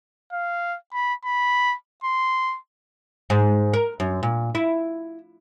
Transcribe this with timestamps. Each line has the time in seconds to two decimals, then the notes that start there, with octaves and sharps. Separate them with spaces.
0.33 F5
0.93 B5
1.25 B5
2.04 C6
3.30 G#2
3.73 A#4
4.00 F#2
4.23 A#2
4.55 E4